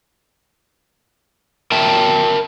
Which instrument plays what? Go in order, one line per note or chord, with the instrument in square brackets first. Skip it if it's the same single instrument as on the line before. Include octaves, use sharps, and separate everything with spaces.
[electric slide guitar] A#4 E5 G5 A5